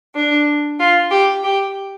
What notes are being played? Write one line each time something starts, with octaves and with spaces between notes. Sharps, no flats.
D4
F4
G4
G4